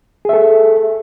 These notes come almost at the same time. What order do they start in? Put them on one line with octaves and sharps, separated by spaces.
G#4 E5 A4